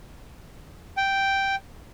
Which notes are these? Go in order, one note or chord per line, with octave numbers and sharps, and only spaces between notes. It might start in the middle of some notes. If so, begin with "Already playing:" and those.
G5